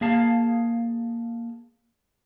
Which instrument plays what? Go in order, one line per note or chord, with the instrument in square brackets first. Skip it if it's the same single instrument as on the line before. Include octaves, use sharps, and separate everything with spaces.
[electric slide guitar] A#3 G#4 F5 A5